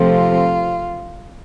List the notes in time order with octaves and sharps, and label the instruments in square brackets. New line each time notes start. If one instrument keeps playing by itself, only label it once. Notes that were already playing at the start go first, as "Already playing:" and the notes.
Already playing: [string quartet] C3 F3 A3 C4 F4